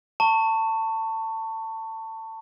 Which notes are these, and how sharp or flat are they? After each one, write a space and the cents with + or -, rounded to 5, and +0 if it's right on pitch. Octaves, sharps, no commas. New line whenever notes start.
A5 +25 C#6 +0